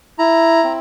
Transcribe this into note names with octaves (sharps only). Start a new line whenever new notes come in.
E4 A#5
C4